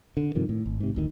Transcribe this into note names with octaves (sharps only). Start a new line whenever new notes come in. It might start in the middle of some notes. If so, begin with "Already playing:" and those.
D3
G2 C3 D#3 F3
A2
G#1
G#2 C3
D1 D2 D#3